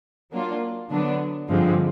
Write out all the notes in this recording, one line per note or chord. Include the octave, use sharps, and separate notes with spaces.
F#3 A#3 D4 F4
D3 F#3 B3 D4
G2 D3 F3 G#3 C4